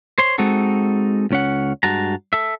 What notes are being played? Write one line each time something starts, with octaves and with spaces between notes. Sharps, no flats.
C5 C#5 C6
G#3 C4 D#4 F#4 A4
C#2 C#4 F#5
G2 G#3 F#4 A5 A#5
A4 E5